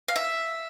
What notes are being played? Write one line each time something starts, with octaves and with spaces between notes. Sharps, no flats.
F5
E5